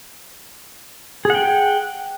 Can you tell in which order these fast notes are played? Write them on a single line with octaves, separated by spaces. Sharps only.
G#4 F#5 G5